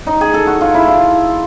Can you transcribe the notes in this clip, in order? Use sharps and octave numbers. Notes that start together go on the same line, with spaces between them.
D#4
G#4
A4
F#4
F4
E4
F4